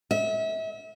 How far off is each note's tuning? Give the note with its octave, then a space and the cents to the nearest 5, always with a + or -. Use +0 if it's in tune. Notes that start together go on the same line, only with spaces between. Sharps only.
E5 -35